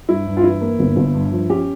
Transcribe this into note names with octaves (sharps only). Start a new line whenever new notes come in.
G2 E4
G2
F4
E3 E4
A#3
G1
G1
G2
F3
C#4 G4